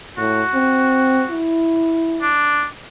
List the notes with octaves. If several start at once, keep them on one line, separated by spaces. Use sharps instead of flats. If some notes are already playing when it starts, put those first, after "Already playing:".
A2 F#4
C4
E4
D4